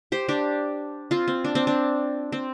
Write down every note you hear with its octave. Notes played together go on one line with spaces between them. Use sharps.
G4 C5
D4 G4
C4 F4
C4
D4
C4
D4
C4